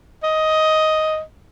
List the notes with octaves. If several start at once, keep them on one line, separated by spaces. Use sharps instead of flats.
D#5